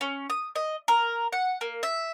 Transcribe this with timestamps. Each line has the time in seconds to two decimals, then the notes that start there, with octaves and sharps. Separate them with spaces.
0.01 C#4
0.30 D#6
0.56 D#5
0.88 A#4
1.33 F#5
1.61 A#3
1.83 E5